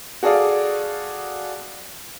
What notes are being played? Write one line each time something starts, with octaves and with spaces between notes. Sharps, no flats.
F#4 G#4 A4 D5 F5